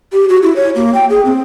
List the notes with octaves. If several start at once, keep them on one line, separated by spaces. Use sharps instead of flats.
G4
F#4
E4
C#5
A#3
G5
G#4
C4